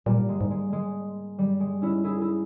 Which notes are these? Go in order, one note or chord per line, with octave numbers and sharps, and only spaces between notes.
A#2 G3 A#3
G#2
G2 G#3
G#2
G#3
G#3
G2 G3
G#3
C#4 E4
E4 G#4
E4 G#4